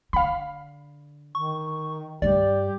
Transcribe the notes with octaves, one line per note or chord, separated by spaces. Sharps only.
D3 F5 B5
D#3 C#6
G2 G3 G4 D5